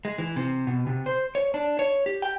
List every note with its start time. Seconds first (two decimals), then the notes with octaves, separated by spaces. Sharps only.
0.05 G#3
0.18 E3
0.36 C3
0.67 B2
0.87 C3
1.06 C5
1.35 C#5
1.54 D4
1.79 C#5
2.06 G4
2.22 G5